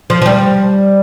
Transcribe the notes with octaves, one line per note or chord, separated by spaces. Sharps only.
F3
F3
G3